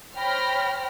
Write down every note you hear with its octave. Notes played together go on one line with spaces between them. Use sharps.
C5 C#5 G5 B5 F6 A#6